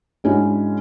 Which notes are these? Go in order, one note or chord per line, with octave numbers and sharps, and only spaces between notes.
G#2 G#3 C#4 D4 E4 F#4